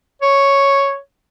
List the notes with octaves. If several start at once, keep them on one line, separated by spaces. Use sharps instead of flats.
C#5